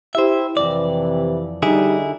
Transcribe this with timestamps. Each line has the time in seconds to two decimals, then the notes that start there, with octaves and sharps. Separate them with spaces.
0.15 E4 G4 C5 E5
0.57 F2 C3 E3 D5
1.62 D3 G3 D#4 E4 G#4